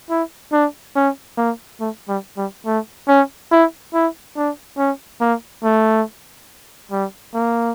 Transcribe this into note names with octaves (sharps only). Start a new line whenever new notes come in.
E4
D4
C#4
A#3
A3
G3
G3
A3
C#4
E4
E4
D4
C#4
A#3
A3
G3
A#3